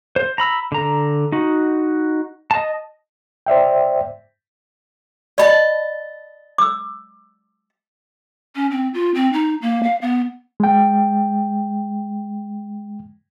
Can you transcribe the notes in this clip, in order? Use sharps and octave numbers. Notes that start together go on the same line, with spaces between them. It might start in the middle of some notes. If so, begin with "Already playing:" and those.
C5
A#5 B5 E6
D3 A#5
D#4 F#4
D#5 A5
C5 D5 E5 G5
D5 D#5 A5 B5
D6 E6
C#4
C4
F4
C4
D#4
A#3
F5
B3
G#3 G5